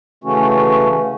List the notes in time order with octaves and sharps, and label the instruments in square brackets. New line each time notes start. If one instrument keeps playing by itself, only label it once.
[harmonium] C#3 E3 A3 C#4 F#4